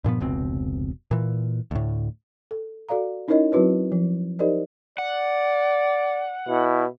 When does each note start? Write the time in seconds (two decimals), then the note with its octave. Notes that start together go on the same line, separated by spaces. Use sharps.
0.04 G2 A#2 F3 B3
0.20 F1 C#2 B2 C4
1.11 A#2 E3
1.71 D2 A2
2.51 A4
2.89 F#4 A4 D5 F5 A#5
3.28 C#4 D#4 E4 A#4 C#5 D#5
3.52 F#3 C4 E4 F#4 B4 C#5
3.92 F3
4.39 D#4 G4 A#4 C5 D5 D#5
4.98 D5 F#5
6.48 B2 E4